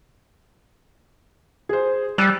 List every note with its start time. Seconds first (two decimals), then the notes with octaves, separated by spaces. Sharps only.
1.69 G#4 C5
2.18 G3 E6 F#6 A6